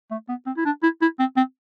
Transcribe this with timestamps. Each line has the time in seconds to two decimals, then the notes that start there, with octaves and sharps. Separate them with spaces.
0.11 A3
0.29 B3
0.46 C4
0.57 E4
0.65 D4
0.82 E4
1.01 E4
1.19 C4
1.36 C4